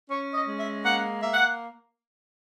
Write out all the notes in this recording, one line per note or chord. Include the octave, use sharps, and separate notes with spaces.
C#4 C#5
D#5
G#3
E5
A#3 F#5
A#3 E5
F#5